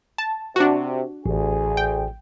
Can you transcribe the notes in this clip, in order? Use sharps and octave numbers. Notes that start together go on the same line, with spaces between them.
A5
C3 D4 F#4
A1 D2 G#4
G5